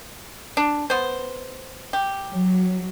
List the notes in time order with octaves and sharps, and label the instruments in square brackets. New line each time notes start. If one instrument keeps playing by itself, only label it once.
[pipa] D4
B3 C5
G4
[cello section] F#3